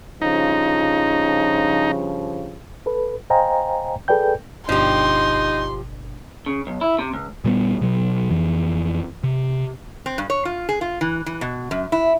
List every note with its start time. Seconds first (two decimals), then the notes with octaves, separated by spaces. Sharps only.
0.22 G2 C#3 F3 D#4
2.86 A4 B4
3.30 C5 D#5 F5 G5 G#5 A#5
4.08 G#4 A4 B4 D5 G5 G6
4.69 G1 B2 F3 D4 D#4 G4 C6
6.46 C#3
6.67 B1
6.81 E4
6.99 C3
7.13 C#2
7.45 A#2 G3 A3 B3
7.81 B2 F#3
8.31 F2 E3
9.24 C3
10.06 C4
10.18 G2
10.30 C#5
10.45 F4
10.69 G#4
10.81 F4
11.01 E3
11.26 E3
11.41 B2
11.71 F#2
11.92 E4